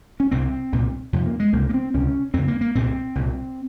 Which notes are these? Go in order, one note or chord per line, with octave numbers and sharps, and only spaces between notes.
C#4
C2 C3 C4
C2 A#2
F2 C3
A#3
G#3
C#2 C3 A#3
A#3
C4
C#2 C3 C#4
F2 C#3 C4
A#3
A#3
C2 A#2 C4
C2 A#2